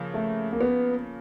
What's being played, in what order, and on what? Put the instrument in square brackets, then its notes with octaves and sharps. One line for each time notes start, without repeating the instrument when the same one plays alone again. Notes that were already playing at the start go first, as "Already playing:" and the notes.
Already playing: [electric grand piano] C#3 F3 A#3
[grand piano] A3
A#3
B3